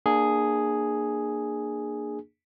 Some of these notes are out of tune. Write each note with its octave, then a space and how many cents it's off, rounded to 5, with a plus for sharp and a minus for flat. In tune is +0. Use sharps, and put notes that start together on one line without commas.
A#3 +0 D4 +30 G#4 +0